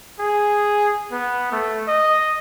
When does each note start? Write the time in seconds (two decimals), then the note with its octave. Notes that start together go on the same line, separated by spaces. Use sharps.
0.19 G#4
1.12 B3
1.52 A3
1.88 D#5